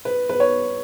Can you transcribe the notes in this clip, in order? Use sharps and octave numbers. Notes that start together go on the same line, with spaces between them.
B4
B4
C#5